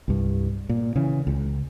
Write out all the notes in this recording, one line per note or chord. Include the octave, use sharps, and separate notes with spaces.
C2 G2
A#2
C#3 E3
C#2